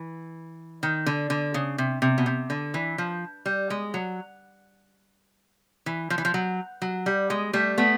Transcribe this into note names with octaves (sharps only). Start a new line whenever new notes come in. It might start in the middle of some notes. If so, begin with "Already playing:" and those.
Already playing: E3
D#3
D3
D3
C#3
C3
C3
B2
C3
D3
E3
F3
G3
G#3
F#3
E3
F3
E3
F3
F#3
F#3
G3
G#3
G3 A3
A3 B3